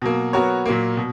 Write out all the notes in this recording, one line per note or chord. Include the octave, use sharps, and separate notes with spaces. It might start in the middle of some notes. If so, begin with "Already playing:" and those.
B2 F#3 A#3
F#3 B3 F#4 A#4 C#5
A#2 F#3 A#3
B2